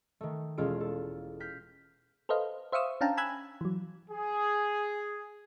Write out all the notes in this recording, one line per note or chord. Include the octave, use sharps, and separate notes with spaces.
D#3 A3
E1 G#3 C#4 F4 A4 D7
A4
F6 G6 B6 C7
A4 B4 C5 D#5 F5
C5 E5 F5 C#6 D#6 E6
C#4 D4 F5 G5 A5 A#5
G#5 B5 E6 F#6 G#6
E3 F#3
G#4